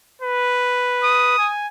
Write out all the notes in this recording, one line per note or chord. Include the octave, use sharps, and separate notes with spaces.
B4
D#6
G#5